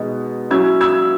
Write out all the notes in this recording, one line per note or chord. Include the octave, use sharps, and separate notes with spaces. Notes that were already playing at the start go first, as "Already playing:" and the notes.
Already playing: B2 G#3 B3 D#4
F#3 C#4 E4 E6 G#6
E6 G#6